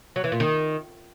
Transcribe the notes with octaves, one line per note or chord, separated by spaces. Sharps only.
F#3
E3
A#2
D#3